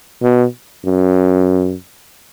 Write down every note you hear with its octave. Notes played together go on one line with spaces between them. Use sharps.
B2
F#2